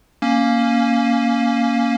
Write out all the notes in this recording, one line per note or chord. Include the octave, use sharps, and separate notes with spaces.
A#3 C#4